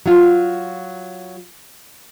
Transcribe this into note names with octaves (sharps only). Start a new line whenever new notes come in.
F#3 F4